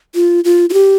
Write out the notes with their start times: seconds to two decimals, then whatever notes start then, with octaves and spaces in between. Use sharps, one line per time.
0.15 F4
0.45 F4
0.70 F4
0.73 G4